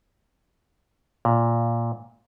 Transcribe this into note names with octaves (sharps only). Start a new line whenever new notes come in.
A#2